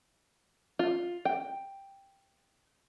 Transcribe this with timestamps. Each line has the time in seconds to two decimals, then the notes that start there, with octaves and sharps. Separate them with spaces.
0.79 F4
1.25 G5